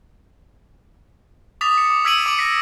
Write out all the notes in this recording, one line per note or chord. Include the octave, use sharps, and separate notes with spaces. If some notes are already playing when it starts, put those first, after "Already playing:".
D6 D#6 A6 B6 F7
C#7
D6
E6 G#6 B6 D7 D#7 F#7
D6 D7 D#7 F#7
A#6 B6 C#7